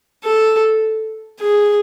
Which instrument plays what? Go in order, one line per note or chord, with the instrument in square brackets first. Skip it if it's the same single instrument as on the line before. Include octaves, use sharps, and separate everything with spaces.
[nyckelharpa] A4
G#4